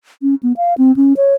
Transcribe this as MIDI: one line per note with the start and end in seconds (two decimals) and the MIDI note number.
0.22 0.35 61
0.43 0.53 59
0.57 0.74 77
0.78 0.95 60
0.96 1.13 61
1.17 1.34 73